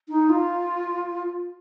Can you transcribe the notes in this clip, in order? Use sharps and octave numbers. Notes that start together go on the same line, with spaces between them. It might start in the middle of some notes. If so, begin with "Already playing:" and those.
D#4
F4